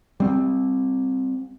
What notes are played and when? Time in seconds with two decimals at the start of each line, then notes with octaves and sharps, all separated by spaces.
0.20 G3 C4